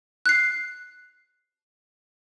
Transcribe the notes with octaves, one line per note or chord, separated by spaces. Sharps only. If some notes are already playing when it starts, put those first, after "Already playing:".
F#6 C7